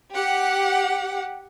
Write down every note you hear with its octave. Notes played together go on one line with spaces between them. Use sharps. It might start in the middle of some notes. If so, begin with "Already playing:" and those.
G4 F#5